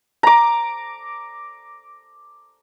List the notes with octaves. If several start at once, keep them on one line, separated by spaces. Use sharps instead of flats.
A#5 D6